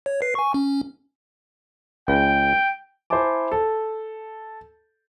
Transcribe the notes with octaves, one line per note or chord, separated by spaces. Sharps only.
C#5
B4 C7
G#5 C#6
C#4
C#2 G5
E4 C5 E5 G#5 A5 D6
A4